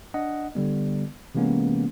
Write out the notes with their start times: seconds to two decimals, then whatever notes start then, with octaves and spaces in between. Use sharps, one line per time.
0.14 D4 D#5 F#5
0.55 D3 G3 B3
1.35 C3 E3 G#3 A#3 B3 C#4